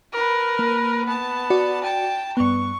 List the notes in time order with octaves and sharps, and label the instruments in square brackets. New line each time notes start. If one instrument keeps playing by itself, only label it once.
[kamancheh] A#4 B4
[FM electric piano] A#3
[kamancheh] B3 A5
[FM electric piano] F#4 D5
[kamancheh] G5 A5
[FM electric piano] G2 B3 [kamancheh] C#6